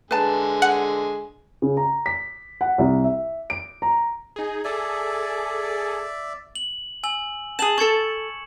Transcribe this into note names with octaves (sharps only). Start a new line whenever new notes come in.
D3 G#3 B4 G#5 A5
F#5
C#3
A#5
B6
F#5
C2
E5
D7
A#5
D#4 G#4
G#4 A4 D5 E5
F#7
G#5 E6 F#7
G#4 A5 E7 F#7
A4 A5 C#6 G#6 C#7